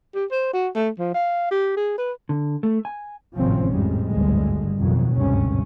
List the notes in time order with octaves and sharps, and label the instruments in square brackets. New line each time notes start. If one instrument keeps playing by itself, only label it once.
[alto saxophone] G4
C5
F#4
A3
F3
F5
G4
G#4
B4
[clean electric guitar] D3
A3
G#5
[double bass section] G#1 A2 C3 F3 C4 C#4
F2 A2 G3 G#3
G#1 D2 G2 D3 G3 G#3
A1 F2 B2 D#3 F#3
G#1 D2 G2 C3 C#4